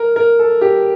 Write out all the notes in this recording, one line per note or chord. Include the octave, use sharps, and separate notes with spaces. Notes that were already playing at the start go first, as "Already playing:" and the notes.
Already playing: A#4
A#4
A4
G4